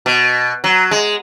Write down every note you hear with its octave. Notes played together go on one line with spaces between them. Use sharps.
B2
F#3
G#3